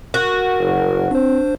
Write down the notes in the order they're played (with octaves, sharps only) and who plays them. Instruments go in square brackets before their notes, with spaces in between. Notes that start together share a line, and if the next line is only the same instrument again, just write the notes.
[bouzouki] F#4 [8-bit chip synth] A#4
[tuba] F#1
[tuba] C4 [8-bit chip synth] D4 C5